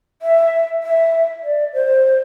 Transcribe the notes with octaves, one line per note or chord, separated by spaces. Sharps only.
E5
E5
D5
C5